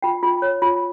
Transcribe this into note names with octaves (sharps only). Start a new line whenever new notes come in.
F4 G5
F4
C#5
F4